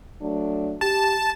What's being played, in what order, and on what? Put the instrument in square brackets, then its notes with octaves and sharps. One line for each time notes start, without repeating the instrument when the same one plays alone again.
[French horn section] F#3 A3 D4
[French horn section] G4 [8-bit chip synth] A5